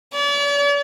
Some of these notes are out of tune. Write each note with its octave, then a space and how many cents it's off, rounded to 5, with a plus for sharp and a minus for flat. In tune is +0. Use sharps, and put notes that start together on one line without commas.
D5 -45